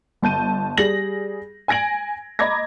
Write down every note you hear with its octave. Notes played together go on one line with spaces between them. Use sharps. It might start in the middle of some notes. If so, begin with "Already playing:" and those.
G1 A5 G6 D#7
G3 G#4 A#6 F#7
G#5 G#6 A#6 D7 F#7
D#5 A#5 B5 D6 G#6 A#6